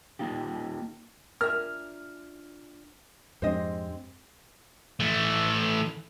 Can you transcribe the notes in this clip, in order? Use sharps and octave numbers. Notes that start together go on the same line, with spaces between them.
A#3 D#4 F4 G4
D4 F4 A#4 E5 G#5 F6
F2 G#2 G#3 C4 D4 G4 C5 D#5
E3 A3